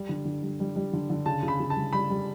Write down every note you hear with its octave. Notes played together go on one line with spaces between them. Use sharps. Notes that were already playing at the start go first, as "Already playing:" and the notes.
Already playing: G3
D3
D3
G3
G3
G3
D3
D3
C#3 A5
C#3
B5
C#3
A5
G3
G3 B5
G3